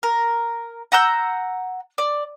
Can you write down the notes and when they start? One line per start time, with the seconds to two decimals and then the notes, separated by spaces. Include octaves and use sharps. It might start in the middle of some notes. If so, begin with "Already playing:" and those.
0.03 A#4
0.92 F#5 A#5 E6 G6
1.98 D5